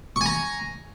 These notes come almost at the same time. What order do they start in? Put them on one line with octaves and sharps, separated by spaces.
C#6 G#5 A#5